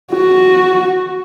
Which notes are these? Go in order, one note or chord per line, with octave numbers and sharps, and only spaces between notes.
F#4